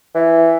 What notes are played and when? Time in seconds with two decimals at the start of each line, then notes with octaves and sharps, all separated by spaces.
0.15 E3